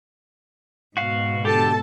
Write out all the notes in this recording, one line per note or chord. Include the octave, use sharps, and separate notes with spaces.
G#2 B2 F#4 F5
D3 G4 A4 A5